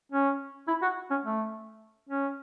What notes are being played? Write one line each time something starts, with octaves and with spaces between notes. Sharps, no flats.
C#4
E4
F#4
C#4
A3
C#4